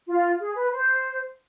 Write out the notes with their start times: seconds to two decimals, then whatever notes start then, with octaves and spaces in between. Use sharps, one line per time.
0.07 F4
0.40 G#4
0.55 B4
0.72 C5